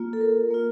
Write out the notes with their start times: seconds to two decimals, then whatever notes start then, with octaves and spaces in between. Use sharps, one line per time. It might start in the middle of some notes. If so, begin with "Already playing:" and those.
Already playing: A#3 F4
0.13 A4
0.21 A#4
0.51 A#3 F4